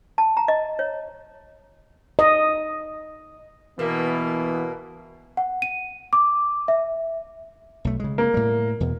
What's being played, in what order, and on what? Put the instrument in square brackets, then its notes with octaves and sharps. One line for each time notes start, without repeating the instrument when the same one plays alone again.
[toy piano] A5
A#5
D#5
C#5
[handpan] D#5
[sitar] B2 A#3 [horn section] E3 B3
[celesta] F#5
D#7
D6
E5
[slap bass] B1 A3
C#3 G#3
[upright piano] A#3
[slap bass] A2 G3
E2 B2